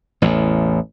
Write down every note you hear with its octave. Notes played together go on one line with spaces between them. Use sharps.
A1 E2